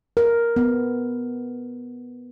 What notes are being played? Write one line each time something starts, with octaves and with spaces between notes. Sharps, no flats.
A#4
B3